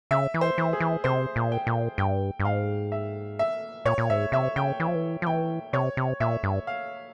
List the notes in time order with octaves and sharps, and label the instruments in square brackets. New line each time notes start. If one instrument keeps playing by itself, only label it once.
[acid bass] C#3 [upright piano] E5
[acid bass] E3
[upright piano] C5
[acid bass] E3
[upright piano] G#4
[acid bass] E3
[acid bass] C3 [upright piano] C5
[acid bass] A#2
[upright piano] G5
[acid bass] A#2
[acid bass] G2 [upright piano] G5
[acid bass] G2
[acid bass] G#2 [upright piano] F5
[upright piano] E5
E5
[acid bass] A#2 [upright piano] C#5
[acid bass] A#2
[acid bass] G#2 [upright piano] E5
[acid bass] C3 [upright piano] E5
[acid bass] C#3 [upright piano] G5
[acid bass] E3
F3
E3
F3
[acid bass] E3 [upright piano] G5
[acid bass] C3 [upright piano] C#5
[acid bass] C3
[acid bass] A#2 [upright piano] E5
[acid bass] G2
[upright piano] F5